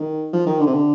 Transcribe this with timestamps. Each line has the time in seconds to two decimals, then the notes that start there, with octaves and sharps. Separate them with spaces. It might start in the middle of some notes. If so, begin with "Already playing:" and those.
Already playing: D#3
0.33 F3
0.46 D#3
0.60 D3
0.67 C3
0.73 D3